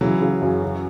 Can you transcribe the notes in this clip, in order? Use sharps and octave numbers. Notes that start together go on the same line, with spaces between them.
C#3 E3 F#3
C#3
F#2
C#3